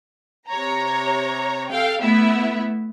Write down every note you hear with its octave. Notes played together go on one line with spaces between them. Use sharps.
C3 C#5 A#5
A4 F5 G5
A3 B3 E4 E5